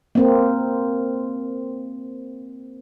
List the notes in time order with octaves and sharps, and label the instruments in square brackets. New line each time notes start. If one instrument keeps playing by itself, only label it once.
[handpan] A#3 C4